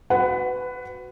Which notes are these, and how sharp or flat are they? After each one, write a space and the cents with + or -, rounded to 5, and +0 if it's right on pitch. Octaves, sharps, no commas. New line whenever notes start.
F#4 +0 B4 +20 F#5 +0